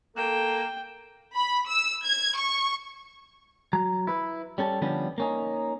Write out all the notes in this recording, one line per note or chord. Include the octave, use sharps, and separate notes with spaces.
A#3 A4 G5 E7
B5
E6
G#6
C#6
F#3 A#5
E4 B4
G3 C#4 A4
D3 F3 G3 B3 C#4 D4
A#3 C#4 D#4